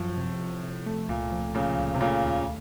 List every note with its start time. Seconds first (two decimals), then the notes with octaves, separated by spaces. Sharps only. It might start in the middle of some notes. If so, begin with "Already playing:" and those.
Already playing: F#2 A2 F3
0.17 C3
0.39 C3
0.63 C3
0.86 A3
1.08 C#2 A#2
1.32 F3
1.54 A#2 C#3 A3
1.78 C#2
1.94 C3
2.00 A#2 C#3 A3
2.24 D#2